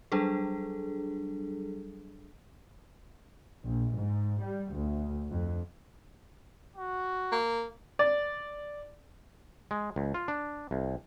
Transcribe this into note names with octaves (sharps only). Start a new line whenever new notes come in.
F#3 G3 D4 G#4 A4
A#1
G#2
G3
D2
F2
F#4
A#3
D5
G#3
C#2
F4
D4
C2